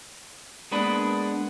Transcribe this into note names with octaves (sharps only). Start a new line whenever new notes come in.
G#3 A#3 B3 D4 B4